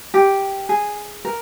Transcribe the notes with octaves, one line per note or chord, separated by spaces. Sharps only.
G4
G#4
A#4